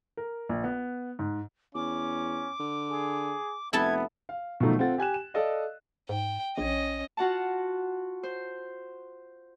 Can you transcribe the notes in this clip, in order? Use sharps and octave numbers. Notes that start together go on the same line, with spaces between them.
A#4
A#1
B3
G#2
E2 C#4 D6
D3
G#4
F1 B3 E4 A4 A5 G#6
F5
B2 D#3 F3 F#3 A3 D#4
C4 F4 A4 F#5 A6
G4 G#5 F#6 E7
E7
A4 D5 D#5 F5
G#2 G5
A#1 C#4 D#5
F4 F#4 F#5 A5
C5